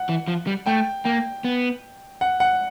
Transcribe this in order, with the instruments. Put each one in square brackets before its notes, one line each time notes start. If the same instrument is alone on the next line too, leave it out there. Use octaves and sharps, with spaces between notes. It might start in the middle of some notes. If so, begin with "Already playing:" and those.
Already playing: [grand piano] F#5
[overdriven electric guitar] E3
F3
G3
[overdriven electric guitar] A3 [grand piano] G5
[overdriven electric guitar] A#3 [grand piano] G5
[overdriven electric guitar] B3
[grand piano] F#5
F#5